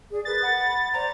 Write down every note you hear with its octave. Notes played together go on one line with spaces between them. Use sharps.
G#4 D5
A#4 B4 D#6 A6
F#5 B5
C5 D5 A#5